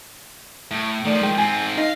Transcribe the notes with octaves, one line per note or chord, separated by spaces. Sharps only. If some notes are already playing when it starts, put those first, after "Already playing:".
A2
D#3 F3 A3 D5
G#3 G5
G#2 C4 G#5
D#4 F5 A#6